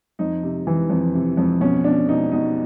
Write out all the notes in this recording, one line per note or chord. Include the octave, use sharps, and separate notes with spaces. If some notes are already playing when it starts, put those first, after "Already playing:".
F2 D#4
C3
E3
F2
C3
F2
B2 C#4
B2 D4
B2 D#4
B2 D#4